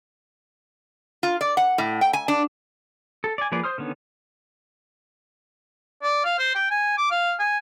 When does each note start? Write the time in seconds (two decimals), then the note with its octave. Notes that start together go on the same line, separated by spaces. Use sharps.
1.23 F4
1.41 D5
1.57 F#5
1.78 A2
2.01 G5
2.13 G#5
2.28 D4
3.24 A4
3.38 D5 G#5
3.52 F3 A#3 G#4 B4 D5
3.64 C5 C6 D#6 F6
3.78 D3 D#3 B3 C#4
6.03 D5
6.25 F5
6.39 C5
6.55 G5
6.71 G#5
6.98 D6
7.11 F5
7.39 G#5